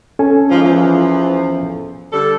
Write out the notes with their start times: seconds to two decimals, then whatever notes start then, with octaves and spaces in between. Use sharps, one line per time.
0.19 C#4 A4 G#5
0.50 G#2 F3
0.63 E2 E3 F3
2.12 D3 G3 A4